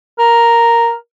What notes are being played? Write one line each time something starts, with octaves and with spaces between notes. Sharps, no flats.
A#4